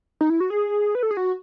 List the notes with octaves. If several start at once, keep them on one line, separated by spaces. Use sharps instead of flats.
D#4
E4
F#4
G#4
B4
A4
G#4
F#4